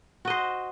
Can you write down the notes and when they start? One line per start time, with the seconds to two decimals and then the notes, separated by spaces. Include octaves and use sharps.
0.25 F#4
0.27 D#5
0.30 C5